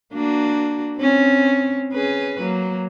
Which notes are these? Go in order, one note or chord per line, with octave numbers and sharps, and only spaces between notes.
A#3 D4 F#4
C4 C#4
C#4 G#4 B4
F#3 A#3